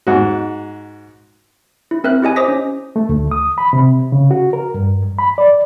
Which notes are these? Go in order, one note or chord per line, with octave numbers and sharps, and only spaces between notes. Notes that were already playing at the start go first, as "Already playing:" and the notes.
G#2 F#4
E4
C4 A#4 E5 F#6
E4 G4 D#5 G#5
C5 D#5 D6 D#6 A#6 B6
C#4
A3
D2
D#6
B5
C3
C#3
F#4
A#4
G2
B5
D5